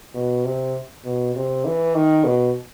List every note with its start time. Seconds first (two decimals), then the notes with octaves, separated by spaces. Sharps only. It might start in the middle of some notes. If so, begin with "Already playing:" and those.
0.15 B2
0.45 C3
1.05 B2
1.36 C3
1.65 E3
1.95 D#3
2.24 B2